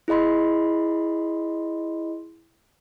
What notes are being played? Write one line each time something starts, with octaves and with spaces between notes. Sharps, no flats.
E4 G#4 D#5 B5 C6